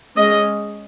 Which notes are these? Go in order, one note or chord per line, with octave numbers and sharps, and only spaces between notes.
G#3 C#4 D#5